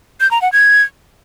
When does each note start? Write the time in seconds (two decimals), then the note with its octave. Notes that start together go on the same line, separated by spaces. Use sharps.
0.20 G6
0.31 A#5
0.42 F#5
0.52 G#6